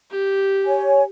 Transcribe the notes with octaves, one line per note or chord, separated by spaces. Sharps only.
G4
C#5 G#5